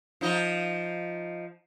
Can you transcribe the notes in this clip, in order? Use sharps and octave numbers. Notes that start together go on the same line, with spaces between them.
F3 D#4 D#5